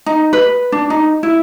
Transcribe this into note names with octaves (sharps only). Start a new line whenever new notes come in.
D#4
B4
D4
D#4
E4